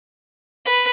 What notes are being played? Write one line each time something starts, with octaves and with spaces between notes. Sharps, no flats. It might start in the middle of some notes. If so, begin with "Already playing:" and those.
B4